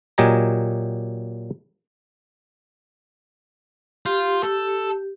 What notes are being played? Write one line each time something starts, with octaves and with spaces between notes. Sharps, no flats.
A#2 F#3 G4 D#5 G#5 A#5
F4 G4
A4